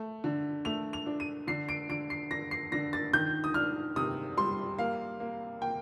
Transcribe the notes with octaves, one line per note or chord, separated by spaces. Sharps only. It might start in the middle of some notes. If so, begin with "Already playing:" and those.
Already playing: A3
D3
A3 F7
F7
D4
D#7
D3 C7
D7
D3 D7
C7
D3 A#6
C7
D3 A#6
A6
D#3 G6
D#6
D4 F6
C3 D#6
G3 C6
A#3 F5
A#3
A#3 G5